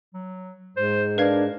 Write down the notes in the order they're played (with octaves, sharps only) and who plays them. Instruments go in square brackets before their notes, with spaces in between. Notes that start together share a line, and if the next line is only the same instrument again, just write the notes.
[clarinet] F#3
[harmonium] G#2 [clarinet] C5
[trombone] D4 [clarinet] A#4 [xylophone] B4 F5 G#6